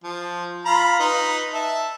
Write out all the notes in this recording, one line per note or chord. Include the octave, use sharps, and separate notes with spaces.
F3
F4 A#5 B5
D#4 B4
E5 A5